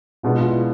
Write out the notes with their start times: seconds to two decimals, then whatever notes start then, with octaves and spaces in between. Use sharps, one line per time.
0.23 B2 G#3 D4 F4
0.40 F4
0.46 E4